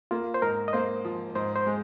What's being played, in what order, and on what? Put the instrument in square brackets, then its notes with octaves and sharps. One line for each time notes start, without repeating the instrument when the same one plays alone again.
[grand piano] A#3 [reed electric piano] F4
[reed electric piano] C5
[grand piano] G#2 [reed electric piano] A#4
[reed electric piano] D#5
[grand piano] A#3 [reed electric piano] C5
[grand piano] F3
[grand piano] G#2 [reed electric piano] C5
[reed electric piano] C5
[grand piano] G#3